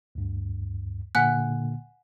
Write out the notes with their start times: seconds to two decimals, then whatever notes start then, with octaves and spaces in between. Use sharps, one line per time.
0.15 D2 G2
1.15 A#2 D3 A#3 F#5 G#5 F#6